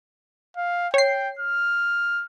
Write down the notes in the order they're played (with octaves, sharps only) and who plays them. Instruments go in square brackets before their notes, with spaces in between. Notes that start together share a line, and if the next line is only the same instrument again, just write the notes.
[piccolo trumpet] F5
[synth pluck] C#5 C7 [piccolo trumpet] G5
[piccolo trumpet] F6